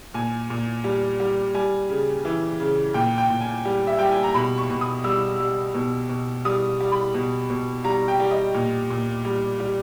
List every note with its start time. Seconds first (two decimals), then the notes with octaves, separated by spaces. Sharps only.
0.14 A#2 G#5
0.50 A#2
0.84 G3
1.20 G3
1.54 G3 G#5
1.90 C#3
2.25 E3
2.60 C#3
2.94 A#2 G5
3.18 G5
3.30 A#2
3.41 G#5
3.65 G3
3.87 E5
3.99 G3 G5
4.11 G#5
4.23 A#5
4.34 B2 B5
4.58 C#6
4.70 B2
4.81 D#6
5.04 G3 E6
5.40 G3
5.74 B2
6.09 B2
6.45 G3 D#6
6.80 G3
6.92 B5
7.14 B2
7.50 B2
7.84 G3 A#5
8.08 G5
8.20 G3
8.31 D#5
8.54 A#2
8.90 A#2
9.25 G3
9.60 G3